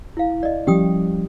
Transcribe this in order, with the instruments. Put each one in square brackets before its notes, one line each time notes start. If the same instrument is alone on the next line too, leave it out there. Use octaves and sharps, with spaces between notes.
[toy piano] E4 F5
D5 D#5
[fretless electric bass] F3 G3 C#4 [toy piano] G4 G5 D#6